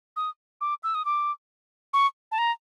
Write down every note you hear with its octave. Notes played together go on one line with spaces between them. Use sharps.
D#6
D6
E6
D#6
D6
C#6
A5
A#5